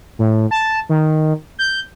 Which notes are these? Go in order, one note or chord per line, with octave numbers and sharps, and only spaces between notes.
A2
A5
D#3
G6